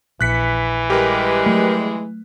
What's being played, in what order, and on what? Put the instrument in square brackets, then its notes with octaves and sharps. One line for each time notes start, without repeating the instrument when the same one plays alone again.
[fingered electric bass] A#1 [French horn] E3 [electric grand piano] F#6 B6 C#7
[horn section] G3 G#3 [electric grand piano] G4 A#4 B4
[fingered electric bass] F#3 A3